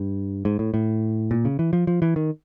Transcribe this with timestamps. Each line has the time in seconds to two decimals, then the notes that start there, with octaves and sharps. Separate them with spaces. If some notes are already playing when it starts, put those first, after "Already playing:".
Already playing: G2
0.45 G#2
0.59 A2
0.74 A2
1.31 A#2
1.45 C#3
1.59 E3
1.73 F3
1.87 F3
2.02 E3
2.16 D#3